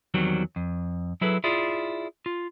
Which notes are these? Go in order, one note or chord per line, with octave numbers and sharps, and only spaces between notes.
E2 D#3 F#3 G3 C4
F2
F#3 E4 G#4 A4 B4
E4 F4 G#4 D5
F4